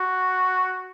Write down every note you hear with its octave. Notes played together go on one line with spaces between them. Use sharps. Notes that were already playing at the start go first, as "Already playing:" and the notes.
Already playing: F#4